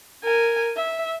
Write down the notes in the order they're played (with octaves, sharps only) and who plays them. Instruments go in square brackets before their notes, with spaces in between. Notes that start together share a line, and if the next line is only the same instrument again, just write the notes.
[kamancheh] A#4 G#5
E5